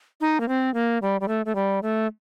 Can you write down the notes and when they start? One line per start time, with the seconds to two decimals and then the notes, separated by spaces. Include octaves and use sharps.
0.21 D#4
0.40 A#3
0.48 C4
0.74 A#3
1.02 G3
1.21 G3
1.28 A3
1.46 A3
1.55 G3
1.83 A3